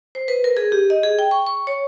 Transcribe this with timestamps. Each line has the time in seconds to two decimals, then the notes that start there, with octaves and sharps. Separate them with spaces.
0.15 C5
0.28 B4
0.44 A#4
0.57 G#4
0.72 G4
0.90 D#5
1.03 G#4
1.19 G5
1.31 C#6
1.46 C#6
1.67 C#5